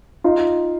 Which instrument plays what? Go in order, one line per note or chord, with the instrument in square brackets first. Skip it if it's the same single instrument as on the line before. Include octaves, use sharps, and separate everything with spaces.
[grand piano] D#4 F4